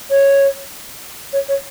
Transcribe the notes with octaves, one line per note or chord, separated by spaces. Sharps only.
C#5
C#5
C#5